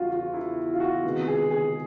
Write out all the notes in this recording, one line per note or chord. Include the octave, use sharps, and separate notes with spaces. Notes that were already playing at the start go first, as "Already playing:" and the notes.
Already playing: E2 C#3 E3 G3 F4 F#4
F4
E4
F4
F#4
C3 D#3 G#3 B3
G#4
G#4